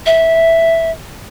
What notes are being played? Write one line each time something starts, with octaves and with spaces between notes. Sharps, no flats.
E5